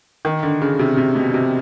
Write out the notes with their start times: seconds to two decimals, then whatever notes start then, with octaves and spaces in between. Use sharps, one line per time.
0.25 D#3
0.43 D3
0.62 C#3
0.79 C3
0.97 C3
1.15 B2
1.34 C3